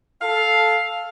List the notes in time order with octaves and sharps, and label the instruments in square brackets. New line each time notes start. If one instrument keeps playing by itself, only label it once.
[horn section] A4 F5